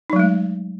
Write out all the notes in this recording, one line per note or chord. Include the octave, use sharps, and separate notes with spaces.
F#3 G#3 A3 D#4